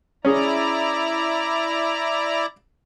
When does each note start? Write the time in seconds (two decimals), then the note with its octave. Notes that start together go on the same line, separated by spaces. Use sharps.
0.25 C#4 E4 G#4 D5 A#5